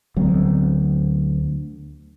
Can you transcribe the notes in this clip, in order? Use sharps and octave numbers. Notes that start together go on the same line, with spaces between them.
D2 F#3 B3 C4